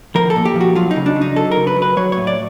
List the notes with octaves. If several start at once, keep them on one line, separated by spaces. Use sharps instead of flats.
F3 A#4
A4
A#2
G4
F3 F#4
F#3 F4
D#4
C#3
D4
F#3
D#4
F#3 A4
A#4
C#3
B4
F#3
B4
F#3 C#5
A2 C#5
D5